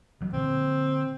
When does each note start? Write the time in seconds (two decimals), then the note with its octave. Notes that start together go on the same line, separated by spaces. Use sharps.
0.21 D2 F#3 B3
0.33 A#2 D3 C4